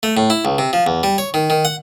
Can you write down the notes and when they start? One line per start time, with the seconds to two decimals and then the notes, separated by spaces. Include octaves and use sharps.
0.03 A3
0.17 A2
0.30 E4
0.45 C#2
0.58 C3
0.73 F3
0.87 E2
1.03 G3
1.18 C#5
1.34 D#3
1.50 D#3
1.65 F#5